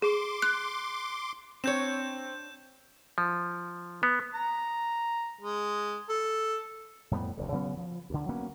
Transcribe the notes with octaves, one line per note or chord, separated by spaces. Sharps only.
G#4 C6 D6
F#6
C4 D4 C#5 G6 E7
F3
B3
A#5
G#3
A4
F2 A2 G3 B3
F1 D2 D3
C#3 F#3 B3 C#4
F3
D2 D3
F#3 A#3 B3 C#4